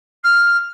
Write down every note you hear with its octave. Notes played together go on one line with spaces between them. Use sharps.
F6